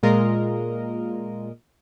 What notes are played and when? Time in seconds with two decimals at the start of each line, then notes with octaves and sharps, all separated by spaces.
0.03 A#2 G#3 F4 A#4 D#5